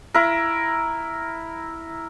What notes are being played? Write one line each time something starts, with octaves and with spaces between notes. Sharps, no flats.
E4 A#4